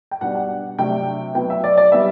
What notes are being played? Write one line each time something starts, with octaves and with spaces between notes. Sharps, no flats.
G5
B2 G3 D4 F#5
F#5
C3 F#3 A3 D4 G5
B2 F#3 B3 G5
E5
D5
D5
G3 B3 E5